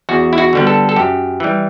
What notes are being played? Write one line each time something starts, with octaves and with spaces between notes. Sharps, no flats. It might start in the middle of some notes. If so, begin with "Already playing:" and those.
E2 F#4
E4
F#4
D3 G3 B3
A4
A4
F#2 G4
E3 G3